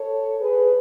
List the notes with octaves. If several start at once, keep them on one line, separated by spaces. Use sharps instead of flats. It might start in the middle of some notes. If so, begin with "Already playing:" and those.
Already playing: A4 C#5
G#4 B4